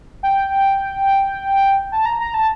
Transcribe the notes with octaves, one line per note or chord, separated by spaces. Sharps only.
G5
A5
A#5
A#5
A5